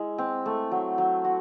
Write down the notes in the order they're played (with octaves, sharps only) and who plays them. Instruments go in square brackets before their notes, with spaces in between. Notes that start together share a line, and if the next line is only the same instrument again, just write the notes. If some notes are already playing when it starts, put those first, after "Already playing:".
Already playing: [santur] G#3 E4
C4
A3
F#3
F#3
F#4